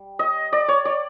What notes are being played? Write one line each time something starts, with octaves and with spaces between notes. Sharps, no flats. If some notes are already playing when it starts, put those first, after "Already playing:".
Already playing: G3
D#5
D5
C#5
D5